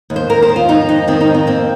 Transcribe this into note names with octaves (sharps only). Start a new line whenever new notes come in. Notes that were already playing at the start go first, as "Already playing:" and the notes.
D#2
C5
D#2 A#4
C5
D#3
F4
F2 D#4
F2 D#4
D#3 C4
D#4
F2
C4
A#3 C4